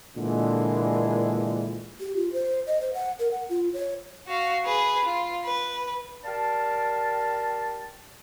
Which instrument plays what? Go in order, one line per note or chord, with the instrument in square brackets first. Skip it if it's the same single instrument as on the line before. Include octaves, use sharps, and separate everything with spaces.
[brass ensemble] A#2 D3 E3 G#3
[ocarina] G4
F4
C5
D#5
C5
F#5
A#4
F#5
F4
C#5
[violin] F#4 F5
G#4 B4
F4
B4
[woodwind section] G4 A#4 D5 F5 A5